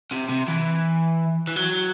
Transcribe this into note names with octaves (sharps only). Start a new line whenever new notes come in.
C3
C3
E3
E3
F#3